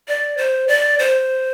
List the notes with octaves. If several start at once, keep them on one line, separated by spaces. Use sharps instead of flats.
D5
C5
D5
C5